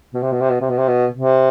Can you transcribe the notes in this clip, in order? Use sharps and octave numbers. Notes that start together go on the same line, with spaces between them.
B2
C3
B2
C3
B2
C3
B2
C3
B2
C3